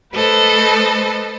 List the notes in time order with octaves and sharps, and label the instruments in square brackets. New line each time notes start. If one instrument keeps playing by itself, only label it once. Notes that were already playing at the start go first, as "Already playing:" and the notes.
[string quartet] A3 A4 B4 C5 D#5